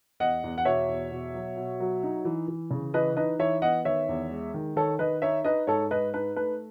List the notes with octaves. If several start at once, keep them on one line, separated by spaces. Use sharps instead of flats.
E2 D#5 F#5
E2
F#5
B2 C#5 E5
E2
B2
F#3
B2
F#3
D#4
E3
E3
C#3
E3 B4 D#5
D#4 B4 D#5
E3 C#5 E5
B3 D#5 F#5
D#3 C#5 E5
E2
G#3
D#3
D#3 A4 C#5
D#3 B4 D#5
D#4 C#5 E5
D#4 B4 D#5
G#2 A4 C#5
G#2 B4 D#5
D#4 B4
A3 B4